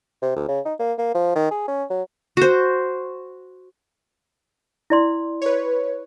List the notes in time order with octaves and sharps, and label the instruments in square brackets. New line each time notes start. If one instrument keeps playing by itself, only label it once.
[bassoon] C3
D2
C#3
D#4
A#3
A#3
F3
D#3
G#4
C#4
F#3
[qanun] F#4 C5
[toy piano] E4 D5 C6
[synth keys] B4 C#5